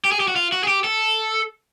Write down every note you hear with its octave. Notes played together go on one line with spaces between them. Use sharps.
G4
G#4
G4
F#4
F4
F#4
G#4
G4
A4